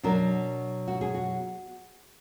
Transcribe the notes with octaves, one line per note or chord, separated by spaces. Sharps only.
B2 F#3 D4 A#4
F#4
G#4
F#4